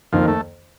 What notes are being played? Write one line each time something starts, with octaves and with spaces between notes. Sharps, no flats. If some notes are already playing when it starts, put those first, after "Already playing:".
F2 D#3 F3 A#3
A3